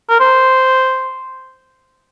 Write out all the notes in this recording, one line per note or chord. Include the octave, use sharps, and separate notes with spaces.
A#4
C5